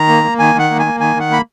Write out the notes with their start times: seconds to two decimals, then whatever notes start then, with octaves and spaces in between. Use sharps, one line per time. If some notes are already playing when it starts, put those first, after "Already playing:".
Already playing: D#3 A#5
0.08 A#3
0.24 A#3
0.39 D#3 G#5
0.55 D#3 F#5
0.70 A#3
0.79 G#5
0.86 A#3
1.00 D#3 G#5
1.16 D#3 F#5
1.31 A#3 B5